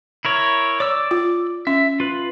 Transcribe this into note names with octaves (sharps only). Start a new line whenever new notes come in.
E4 A#4 C#5
C#5 D5 D6 E6
F4
C#4 E5
F4 B4